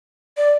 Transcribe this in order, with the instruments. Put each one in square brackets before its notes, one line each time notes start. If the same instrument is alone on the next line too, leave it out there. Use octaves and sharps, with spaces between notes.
[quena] D5